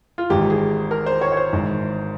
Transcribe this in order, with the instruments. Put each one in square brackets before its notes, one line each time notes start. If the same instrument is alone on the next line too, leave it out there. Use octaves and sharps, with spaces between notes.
[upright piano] F4
G#1 G#2 E3 G4
G#4
A#4
C5
C#5
C#5
C5
G#1 G#2 E3